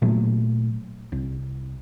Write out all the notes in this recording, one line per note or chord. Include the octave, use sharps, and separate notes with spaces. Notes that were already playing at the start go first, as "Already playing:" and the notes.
A#2 F#3 A3
C2